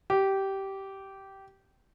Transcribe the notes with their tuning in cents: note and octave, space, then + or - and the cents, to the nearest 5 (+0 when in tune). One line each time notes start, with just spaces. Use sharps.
G4 -15